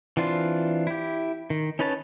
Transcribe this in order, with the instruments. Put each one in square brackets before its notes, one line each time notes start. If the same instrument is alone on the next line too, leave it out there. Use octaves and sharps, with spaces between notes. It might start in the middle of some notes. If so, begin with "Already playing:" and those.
[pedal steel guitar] E3 C4 D4 F4
E4 G4
D#3
C#4 D#4 B4 C#5 A5